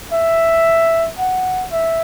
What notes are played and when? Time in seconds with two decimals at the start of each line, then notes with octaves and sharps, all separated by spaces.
0.12 E5
1.19 F#5
1.72 E5